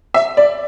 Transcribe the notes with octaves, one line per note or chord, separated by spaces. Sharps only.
E5
D5